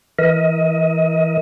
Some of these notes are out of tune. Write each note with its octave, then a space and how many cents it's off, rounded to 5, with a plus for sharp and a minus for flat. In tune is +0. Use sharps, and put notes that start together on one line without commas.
E3 +0 A#4 +15 D#5 +35